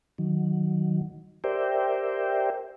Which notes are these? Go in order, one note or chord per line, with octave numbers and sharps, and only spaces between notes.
D#3 F#3
G4 A#4 C5 D5 E5 G5